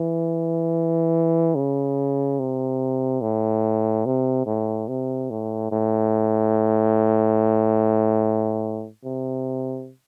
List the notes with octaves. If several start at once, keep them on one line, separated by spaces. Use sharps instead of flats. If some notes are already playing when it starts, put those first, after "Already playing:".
Already playing: E3
C#3
C3
A2
C3
A2
C3
A2
A2
C3